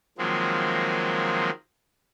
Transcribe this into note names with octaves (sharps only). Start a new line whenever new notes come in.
D#3 F3 F#3 G#3 A#3 C4